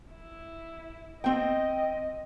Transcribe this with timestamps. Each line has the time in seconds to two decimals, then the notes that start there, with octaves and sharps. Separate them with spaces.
0.12 E4
1.24 C4 D#5 G5